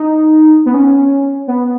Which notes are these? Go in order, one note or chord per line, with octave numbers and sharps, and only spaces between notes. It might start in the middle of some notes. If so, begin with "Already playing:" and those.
Already playing: D#4
B3
C#4
B3